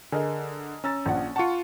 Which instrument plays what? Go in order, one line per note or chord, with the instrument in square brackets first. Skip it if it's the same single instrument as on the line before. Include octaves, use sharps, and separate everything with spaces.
[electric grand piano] D3 [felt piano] G#4 A#4 D#5
[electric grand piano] C#4 [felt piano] A#5 E6 A6
[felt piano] A#1 F3 F#5
[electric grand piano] F4 A5 [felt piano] F#5 C#6 C#7